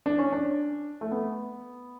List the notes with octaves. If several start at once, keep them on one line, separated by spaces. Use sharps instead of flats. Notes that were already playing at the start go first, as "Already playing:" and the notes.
D4
C#4
D4
A3
B3